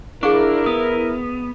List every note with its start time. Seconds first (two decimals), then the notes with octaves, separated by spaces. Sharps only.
0.23 D4 E4 G#4 A#4 F5 C#6
0.66 B3 D#6